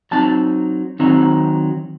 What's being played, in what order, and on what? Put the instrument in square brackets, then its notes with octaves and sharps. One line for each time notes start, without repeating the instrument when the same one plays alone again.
[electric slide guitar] F#3 C4 D#4 A5
D#3 F#3 C4 D#4